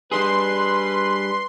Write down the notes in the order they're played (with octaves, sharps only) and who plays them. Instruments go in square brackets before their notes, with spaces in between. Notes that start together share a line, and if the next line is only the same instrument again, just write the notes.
[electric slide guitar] G3 D4 G#4 [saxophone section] B4 [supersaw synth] C6